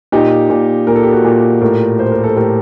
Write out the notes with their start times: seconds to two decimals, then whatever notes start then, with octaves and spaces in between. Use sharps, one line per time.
0.12 A#2 D#4 G4
0.50 A#2
0.87 A#2 A#4
0.96 A4
1.03 G4
1.11 F#4 A4
1.24 A#2
1.61 A2 G4 A#4
1.99 A2 C5
2.12 A#4
2.23 A4 C5
2.36 A2 G4 A#4